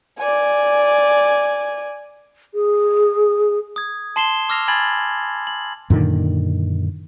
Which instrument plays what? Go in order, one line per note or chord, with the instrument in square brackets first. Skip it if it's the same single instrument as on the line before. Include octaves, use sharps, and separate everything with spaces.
[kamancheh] D5 G#5
[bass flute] G#4
[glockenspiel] D#6 G#6
A5 C6 C7 E7 G7
D6 E6 F6 A#6 C7 F7
G#5 B5 G#6 A6 F#7
F#7
[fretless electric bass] F#2 A#2 D3 D#3